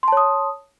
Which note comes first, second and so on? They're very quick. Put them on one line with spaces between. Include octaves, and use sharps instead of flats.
C6 A5 C#5 D#6